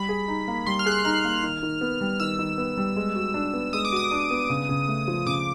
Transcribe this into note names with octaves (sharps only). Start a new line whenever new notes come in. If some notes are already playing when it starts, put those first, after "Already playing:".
Already playing: G3 B5
G#4
D#4
A#3
G3 C6
F6
G#4 F#6
F6
D#4 F6
A#3
D#3
D#3
B3
G3
D#3 E6
D#3
B3
G3
G#3
F#4
D4
B3
G#3 D#6
D6
F#4 D#6
D4
B3
C#3
C#3
A3
F3
C#3 D6